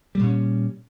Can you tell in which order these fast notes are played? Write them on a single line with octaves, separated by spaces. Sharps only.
G3 A#2 C#4